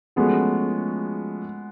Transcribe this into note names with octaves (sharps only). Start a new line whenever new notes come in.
F3 G#3 A3 B3 C#4 F#4